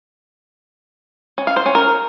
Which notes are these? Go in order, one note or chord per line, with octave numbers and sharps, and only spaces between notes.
C#4
F5
C5
C#4
A#4